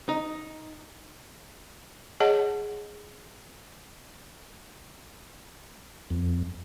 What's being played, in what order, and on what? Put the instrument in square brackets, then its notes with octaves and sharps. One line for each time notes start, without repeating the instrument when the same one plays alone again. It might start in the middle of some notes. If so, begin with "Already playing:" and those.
[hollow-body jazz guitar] D#4
[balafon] G#4 C#5 D#5 F#5 A5
[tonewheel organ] F2